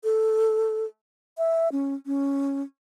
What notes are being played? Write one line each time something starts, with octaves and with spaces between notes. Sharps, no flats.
A4
E5
C#4
C#4